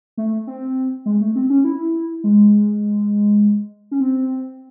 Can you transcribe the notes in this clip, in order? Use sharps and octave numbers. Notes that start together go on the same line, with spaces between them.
A3
C4
G#3
A3
C4
C#4
E4
G#3
C#4
C4